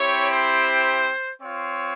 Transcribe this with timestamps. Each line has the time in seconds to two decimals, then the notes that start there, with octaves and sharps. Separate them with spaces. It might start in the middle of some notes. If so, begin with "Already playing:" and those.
Already playing: C4 E4 G4 C#5
0.30 C5
1.42 C4 F4 C#5